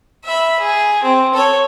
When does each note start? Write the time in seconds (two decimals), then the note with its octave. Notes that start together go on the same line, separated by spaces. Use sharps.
0.24 E5 B5
0.59 G#4
1.03 C4
1.34 A4 C#5